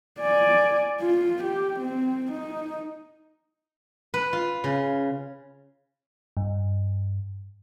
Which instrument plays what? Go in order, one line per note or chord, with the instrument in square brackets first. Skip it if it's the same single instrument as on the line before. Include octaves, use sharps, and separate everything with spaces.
[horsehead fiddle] D5 G#5
F4
G4
C4
D#4
[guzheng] B4
F4
C#3
[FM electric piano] G2